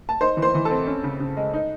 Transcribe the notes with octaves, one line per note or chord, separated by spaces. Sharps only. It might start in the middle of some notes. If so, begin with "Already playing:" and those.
A5
D#4 C5 C6
E3
C5 C6
E3
A4 A5
C4
C#4
C#3
C#3
G#3
D#4